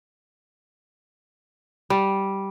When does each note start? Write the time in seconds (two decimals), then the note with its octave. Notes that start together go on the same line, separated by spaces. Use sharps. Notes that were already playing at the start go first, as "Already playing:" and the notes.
1.90 G3